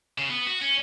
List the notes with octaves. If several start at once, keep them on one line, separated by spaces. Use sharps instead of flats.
C#3
B3
F#4
C#4